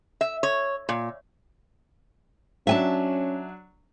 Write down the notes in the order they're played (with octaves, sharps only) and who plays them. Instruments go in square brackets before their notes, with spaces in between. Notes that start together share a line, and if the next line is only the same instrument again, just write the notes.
[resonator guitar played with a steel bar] E5
C#5
A#2
[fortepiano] F#3 D4 [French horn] C#4 [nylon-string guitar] E5 G#5 A5